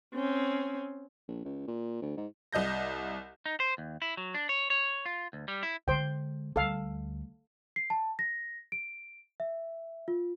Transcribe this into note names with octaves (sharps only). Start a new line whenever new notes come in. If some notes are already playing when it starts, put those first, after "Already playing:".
C4 C#4
A#1
C#2
A#2
D2
G#2
C2 D#5 G6 A#6
D#4
C5
D#2
E4
F#3
D4
C#5
C#5
F4
D2
G3
E4
D3 G#3 C5 G5
D2 G3 A4 F5
C7
A5
A#6
D7
E5
F4